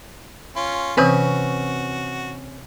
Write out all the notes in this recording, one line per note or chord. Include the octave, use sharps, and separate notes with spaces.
C#4 F4
C3 E3 C4 C#4 F#4 B4 D#6